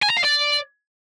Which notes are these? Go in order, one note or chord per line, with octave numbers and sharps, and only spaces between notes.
G#5
A#5
F5
D5